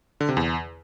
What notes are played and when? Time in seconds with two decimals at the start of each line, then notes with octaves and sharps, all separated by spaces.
0.20 D3
0.29 C3
0.37 E2